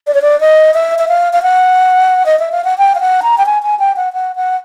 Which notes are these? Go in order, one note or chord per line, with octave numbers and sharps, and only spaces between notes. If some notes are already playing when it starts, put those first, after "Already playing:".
D5
C#5
D5
D#5
E5
E5
F5
F5
F#5
D#5
E5
F5
F#5
G5
F5
F#5
A#5
G5
G#5
G#5
G5
F#5
F#5
F#5